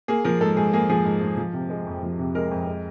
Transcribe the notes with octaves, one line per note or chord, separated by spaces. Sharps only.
A#3 G#4
F3 A#4
G#2 A4
G#2 G#4
A#3 G#4
F3 G#4
G#2
G#2
F3
C3
G#3
F2
F3
C3
G#3 A#4
F2
G#3